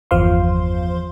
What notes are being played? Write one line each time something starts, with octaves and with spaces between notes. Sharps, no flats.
G1 E2 F3 C5 F5 C6